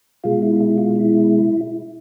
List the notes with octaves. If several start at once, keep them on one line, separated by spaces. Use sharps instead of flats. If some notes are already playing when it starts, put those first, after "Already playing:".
B2 G#3 F4
E4
E4
F4
E4